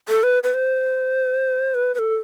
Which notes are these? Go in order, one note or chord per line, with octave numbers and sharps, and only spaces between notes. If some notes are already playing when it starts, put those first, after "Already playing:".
A4
B4
B4
C5
B4
B4
A4